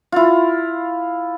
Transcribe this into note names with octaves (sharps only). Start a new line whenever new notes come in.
E4 F4